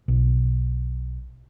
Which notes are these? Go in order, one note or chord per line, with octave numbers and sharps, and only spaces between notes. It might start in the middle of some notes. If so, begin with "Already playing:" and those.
B1